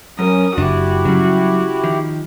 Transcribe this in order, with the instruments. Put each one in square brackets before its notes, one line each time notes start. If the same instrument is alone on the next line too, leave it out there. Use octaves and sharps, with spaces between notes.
[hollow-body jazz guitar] F#2 [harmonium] C#4 [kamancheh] A#4 D#6
[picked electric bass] F#1 [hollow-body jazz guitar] D4 [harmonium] E4 G4 [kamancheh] F#4
[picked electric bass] C#3 [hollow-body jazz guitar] F#3 G3
[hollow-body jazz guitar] D#3 F3